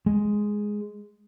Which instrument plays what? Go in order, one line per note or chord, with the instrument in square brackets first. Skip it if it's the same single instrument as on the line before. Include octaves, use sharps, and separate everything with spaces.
[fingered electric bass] G#3